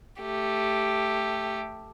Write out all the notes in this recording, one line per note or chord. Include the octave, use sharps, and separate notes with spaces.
A3 G4